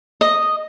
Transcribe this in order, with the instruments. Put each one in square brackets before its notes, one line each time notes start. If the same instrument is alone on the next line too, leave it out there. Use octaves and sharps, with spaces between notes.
[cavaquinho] D#5